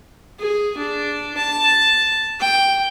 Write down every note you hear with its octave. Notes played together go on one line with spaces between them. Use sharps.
G#4
D4
A5
G5